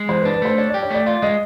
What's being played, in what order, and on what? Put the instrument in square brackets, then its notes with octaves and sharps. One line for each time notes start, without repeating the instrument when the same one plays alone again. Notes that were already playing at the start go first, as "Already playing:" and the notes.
Already playing: [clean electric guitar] G#3
[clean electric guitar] E3 [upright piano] C5
[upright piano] B4
[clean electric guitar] D4
[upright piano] B4
[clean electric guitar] A3 [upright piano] C5
[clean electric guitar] D4 [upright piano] C#5
[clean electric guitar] G4 [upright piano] D5
[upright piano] C#5
[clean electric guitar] A3 [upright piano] D5
[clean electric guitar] F4 [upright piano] D5
[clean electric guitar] G#3 [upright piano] D#5